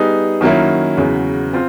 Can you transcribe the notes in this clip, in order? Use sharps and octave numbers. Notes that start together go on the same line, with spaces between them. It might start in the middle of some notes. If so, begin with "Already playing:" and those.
Already playing: G3 B3 D#4 G#4
D#3 F#3 A#3 C#4 E4
E2 C#3 F#3
C4 F4